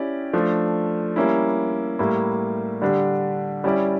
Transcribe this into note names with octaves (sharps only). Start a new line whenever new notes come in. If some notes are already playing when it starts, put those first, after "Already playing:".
Already playing: C#4 E4 G4 D5
F3 A3 D4
G3 A#3 C#4 E4
A2 G3 A#3 E4
D3 G3 D4 G4
G3 C#4 E4 G4 D5